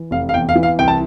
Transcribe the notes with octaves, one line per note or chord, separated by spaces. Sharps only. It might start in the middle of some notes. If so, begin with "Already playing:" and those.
Already playing: E3
F1 F5
F5
E2 G5
F5
E3
F5
C2 G5
A5